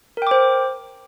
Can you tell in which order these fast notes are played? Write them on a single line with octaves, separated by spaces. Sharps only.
A#4 G5 D6 C5